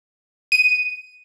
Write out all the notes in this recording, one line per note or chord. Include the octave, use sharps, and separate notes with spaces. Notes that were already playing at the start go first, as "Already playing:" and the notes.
D#7